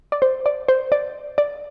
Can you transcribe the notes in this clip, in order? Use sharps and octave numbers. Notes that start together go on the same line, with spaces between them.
D5
C5
D5
C5
D5
D5